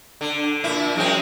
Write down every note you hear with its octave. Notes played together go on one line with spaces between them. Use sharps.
D3
A#2 E4
F#2 G#3 C4